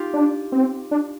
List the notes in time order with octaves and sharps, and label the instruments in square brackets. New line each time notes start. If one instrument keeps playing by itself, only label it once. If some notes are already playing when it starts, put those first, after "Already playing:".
Already playing: [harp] D#4 F4 G4
[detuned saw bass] D4
C4
D4